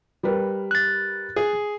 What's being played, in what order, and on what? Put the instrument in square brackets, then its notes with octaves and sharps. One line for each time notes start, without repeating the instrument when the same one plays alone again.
[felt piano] G3 A#4 B4
[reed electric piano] F#6 A6
[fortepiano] G#4